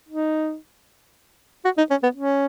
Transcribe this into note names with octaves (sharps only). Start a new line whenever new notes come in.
D#4
F#4
D#4
C#4
B3
C#4